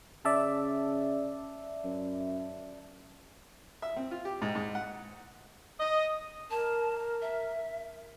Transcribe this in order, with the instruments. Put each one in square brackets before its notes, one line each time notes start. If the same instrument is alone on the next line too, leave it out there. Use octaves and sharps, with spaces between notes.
[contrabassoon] C#3 [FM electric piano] D5 E5 A5
[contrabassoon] F#2
[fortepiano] E5
C4
F4
G4
G#2
G#2
F#5
[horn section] D#5
[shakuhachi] A#4 [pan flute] A5
[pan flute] E5